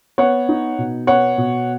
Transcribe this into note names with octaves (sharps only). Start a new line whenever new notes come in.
B3 C#5 F#5
D#4
B2
B3 C#5 F#5
B2